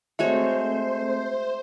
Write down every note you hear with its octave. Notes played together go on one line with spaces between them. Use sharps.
G#3 A3 C4 F#4 A4 C5 C#5 E5